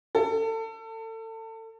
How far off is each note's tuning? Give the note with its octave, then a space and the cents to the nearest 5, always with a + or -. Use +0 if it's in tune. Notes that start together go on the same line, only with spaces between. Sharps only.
A4 +30